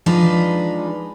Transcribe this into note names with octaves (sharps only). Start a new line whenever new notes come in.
F3 G#3 D4 D#4 B4